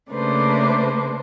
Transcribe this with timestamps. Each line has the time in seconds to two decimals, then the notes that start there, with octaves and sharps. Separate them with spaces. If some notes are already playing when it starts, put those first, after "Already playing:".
0.11 C#3 A3 A#3 D4 B4 C5